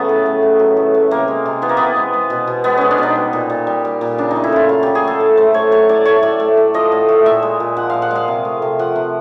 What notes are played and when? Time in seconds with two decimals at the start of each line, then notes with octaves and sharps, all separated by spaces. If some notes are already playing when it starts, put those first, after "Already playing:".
Already playing: C#3 F#3 A3 B3
0.09 A2
0.26 A3
0.42 A2
0.59 F#3
0.77 A2
0.94 A3
1.11 C3 A#3
1.28 G#3
1.46 C3
1.62 E3 B3
1.69 A#3
1.77 C3 B3
1.96 G#3
2.13 G#3
2.30 B2
2.47 B2
2.64 G#3 B3
2.77 G#3 C#4
2.91 D4
2.98 B2 D#4
3.16 G3
3.33 A#2
3.50 A#2
3.67 G3
3.85 G3
4.01 A#2
4.18 C#3 D4
4.31 D#4
4.36 A3
4.44 E4
4.52 C#3 F4
4.69 F#3 F4
4.83 C#3 G4
4.95 G#4
5.04 A3 A4
5.20 A2
5.37 A3 C5
5.54 A2 C#5
5.71 F#3 C#5
5.89 A2 D5
6.05 A3 C#5
6.23 A2 D5
6.40 A3
6.57 A2
6.74 F3 D#5
6.92 A2
7.09 A3
7.26 A#2 E5
7.43 G#3
7.60 A#2
7.77 F3 F#5
7.90 A#2 F5
8.02 F#5
8.11 G#3 F5
8.28 C3
8.45 A3
8.62 C3
8.79 F3 F#5
8.96 C3